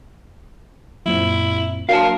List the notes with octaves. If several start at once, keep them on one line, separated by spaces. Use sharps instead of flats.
F#2 A#2 C4 E4
F#3 A#3 D4 A#4 F5 A5